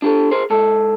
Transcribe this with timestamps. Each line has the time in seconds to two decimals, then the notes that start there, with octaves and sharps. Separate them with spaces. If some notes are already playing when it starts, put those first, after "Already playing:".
0.02 D4 G4 A4
0.31 G#4 A#4 C5
0.50 G#2 A4